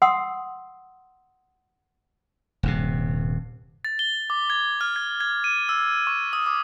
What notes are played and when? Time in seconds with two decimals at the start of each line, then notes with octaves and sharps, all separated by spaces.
0.02 F#5 C6 D#6 E6
2.63 D#1 G2 C3
3.85 A6
3.99 G7
4.30 D6
4.50 G#6
4.81 F6
4.96 G#6
5.20 G#6
5.44 D#7
5.69 E6
6.07 C#6
6.33 D#6
6.46 D6